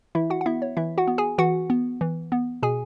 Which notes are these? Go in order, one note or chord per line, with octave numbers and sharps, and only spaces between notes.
E3 E4 E5
F#4 F#5
F#5
B3 E4 E5
C#5
E3 E4 E5
F#4 F#5
B3
G#4 G#5
E3 F#4 F#5
B3
E3
B3
B2 G#4 G#5